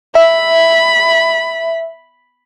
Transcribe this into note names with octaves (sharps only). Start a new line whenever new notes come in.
E5 B5